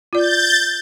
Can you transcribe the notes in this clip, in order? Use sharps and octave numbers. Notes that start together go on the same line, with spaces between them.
F4 D5 G6 A6